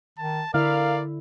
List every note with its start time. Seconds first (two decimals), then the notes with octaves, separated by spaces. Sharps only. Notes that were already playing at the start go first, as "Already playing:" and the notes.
0.18 D#3 A5
0.54 D3 E4 A#4 D5 E5 F5